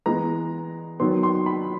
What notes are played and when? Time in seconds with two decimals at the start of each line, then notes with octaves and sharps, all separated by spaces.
0.06 E3 G#3 B3 A#5
1.00 D#3 F#3 B3 C6
1.23 C6
1.46 B5